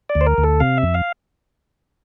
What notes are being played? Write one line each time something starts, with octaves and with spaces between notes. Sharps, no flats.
D5
D2
C5
A#4
D2
A4
C3 F5
E5
F2
F5